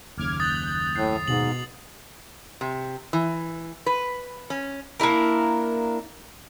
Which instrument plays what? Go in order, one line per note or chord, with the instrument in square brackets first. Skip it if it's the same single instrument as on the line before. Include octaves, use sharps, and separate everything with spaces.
[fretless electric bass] F#1 D#2 C#3 [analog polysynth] D6 F6 G#6
[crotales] D#6 A6 [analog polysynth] F#6 G6
[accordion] A2 [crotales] C7
[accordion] G#2 [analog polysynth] B2 [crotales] F#7
[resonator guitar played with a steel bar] C3
E3
B4
C#4
[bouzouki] A#3 D4 E4 A#4